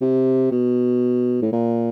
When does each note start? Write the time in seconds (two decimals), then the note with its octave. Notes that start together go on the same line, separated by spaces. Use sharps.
0.02 C3
0.52 B2
1.42 A2
1.52 A#2